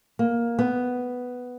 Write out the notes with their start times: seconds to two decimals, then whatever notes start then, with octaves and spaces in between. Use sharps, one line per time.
0.19 A#3
0.59 B3